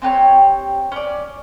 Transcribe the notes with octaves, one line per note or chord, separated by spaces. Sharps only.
C4 G4 B4 C#5
C#4 D5